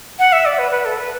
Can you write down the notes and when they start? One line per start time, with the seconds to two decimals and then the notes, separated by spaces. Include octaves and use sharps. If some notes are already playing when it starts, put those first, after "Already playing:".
0.19 F#5
0.33 E5
0.46 D5
0.59 B4
0.72 B4
0.85 A4
0.98 B4